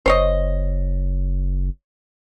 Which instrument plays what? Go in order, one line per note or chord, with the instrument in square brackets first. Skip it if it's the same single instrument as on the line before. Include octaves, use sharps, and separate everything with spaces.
[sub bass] F#1 [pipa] C5 C#5 D#5